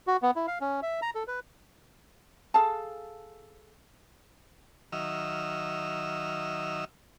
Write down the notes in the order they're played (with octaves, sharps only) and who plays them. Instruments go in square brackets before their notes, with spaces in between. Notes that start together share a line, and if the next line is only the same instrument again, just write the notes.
[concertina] F#4
B3
E4
F5
C#4
E5
A#5
A4
B4
[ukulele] G#4 A4 F5 A5
[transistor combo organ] D#3 F#3 D#5 E5 E6 F6